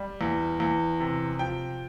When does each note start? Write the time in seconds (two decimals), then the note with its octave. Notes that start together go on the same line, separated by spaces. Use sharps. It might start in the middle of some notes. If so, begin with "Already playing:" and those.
Already playing: G3
0.21 E2
0.60 E2
1.00 C3
1.39 F3 G5